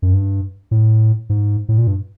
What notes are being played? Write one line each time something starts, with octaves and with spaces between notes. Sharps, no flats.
F#2
G2
A2
G#2
A2
A#2
G2